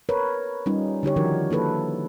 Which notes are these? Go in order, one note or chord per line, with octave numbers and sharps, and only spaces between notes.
A#4 B4 C#5
G3 C#4 D#4 F4
D3 D#4 G4 C#5
D#3 F3 D4 D#4 F#4 A#4
A#3 E4 A4 B4